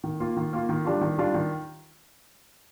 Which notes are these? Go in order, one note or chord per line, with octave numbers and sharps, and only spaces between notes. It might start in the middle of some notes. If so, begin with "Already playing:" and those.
D#3
A#3 F4
D#3
A#3 F4
D#3
G3 D4 F4
D#3
G3 D4 F4
D#3